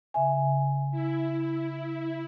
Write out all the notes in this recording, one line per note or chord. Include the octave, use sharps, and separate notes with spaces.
C#3 E5 G#5
E4